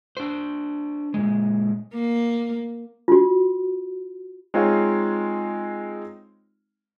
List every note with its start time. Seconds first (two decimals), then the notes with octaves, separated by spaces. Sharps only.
0.17 D4 C5
1.14 A#2 C#3 G#3
1.94 A#3
3.08 F4 F#4
4.54 G#3 C4 D#4 F4 C#5 F5